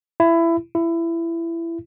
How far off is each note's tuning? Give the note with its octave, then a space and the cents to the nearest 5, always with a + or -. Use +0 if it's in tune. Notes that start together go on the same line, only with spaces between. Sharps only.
E4 +20
E4 +20